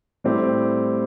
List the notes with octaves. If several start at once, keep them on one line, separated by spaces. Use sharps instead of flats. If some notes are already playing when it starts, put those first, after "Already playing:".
A2 G3 C4 G4